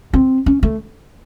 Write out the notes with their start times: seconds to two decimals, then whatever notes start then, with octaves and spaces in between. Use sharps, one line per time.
0.13 C4
0.46 C#4
0.63 A3